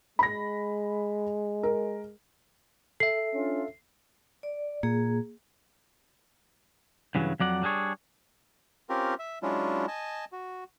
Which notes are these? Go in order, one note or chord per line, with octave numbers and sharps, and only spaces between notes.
G#3 B5 A#6
A#4
A4 E5 C7
C#4 D4 F4
D5
A#2 A#3 G#4
G2 C#3 E3 F#3
F2 F#3 D5 F#5
G3 D4 G#4 C#5
C4 C#4 F4 G4 A#4
E5
F#3 G#3 C#4 D4 E4 F4
D#5 G#5 A5
F#4